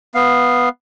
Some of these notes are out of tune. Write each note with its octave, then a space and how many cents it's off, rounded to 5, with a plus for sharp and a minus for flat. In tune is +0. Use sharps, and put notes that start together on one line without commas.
B3 +0 F5 +0